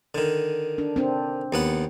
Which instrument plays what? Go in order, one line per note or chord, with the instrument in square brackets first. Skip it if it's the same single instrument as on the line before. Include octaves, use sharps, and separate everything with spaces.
[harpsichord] D3 D#3
[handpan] D4
C4 D4
[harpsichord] D#2 B3 F#5